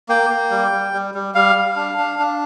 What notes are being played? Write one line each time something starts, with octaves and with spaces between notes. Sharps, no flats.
A#3 G5
A#3
G3
G3
G3
G3
G3 F5
G3
D4
D4
D4